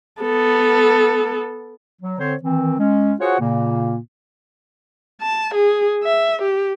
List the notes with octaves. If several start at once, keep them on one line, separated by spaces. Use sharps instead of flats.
B3 A4
F#3
D3 C4 C5 C#5
D#3 E3 C4
G#3 C#4
F4 F#4 G#4 C5 C#5 F#5
A#2 C#3 A#3
A5
G#4
E5
G4